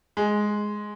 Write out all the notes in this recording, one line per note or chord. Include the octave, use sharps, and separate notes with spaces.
G#3